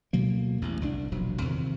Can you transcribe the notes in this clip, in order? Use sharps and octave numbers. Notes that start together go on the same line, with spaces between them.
D2 B2 F#3 A#3
A1 E2
C2 G3 D4
E1 A#1 F3 F#3
E2 C3 D#3 F3